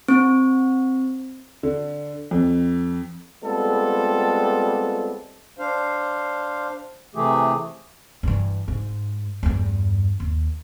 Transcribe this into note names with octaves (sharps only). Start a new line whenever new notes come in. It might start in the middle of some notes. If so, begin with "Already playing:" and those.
C4
D3
F2
G3 G#3 B3 C4 F4 A4
D4 C5 F5
C3 E3 A3 G4 G#4
G2 E3
G#2
E2 G2
D#2